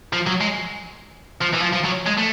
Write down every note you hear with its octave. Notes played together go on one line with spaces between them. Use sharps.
F3
F#3
G#3
F3
E3
F3
F3
F#3
G#3
A3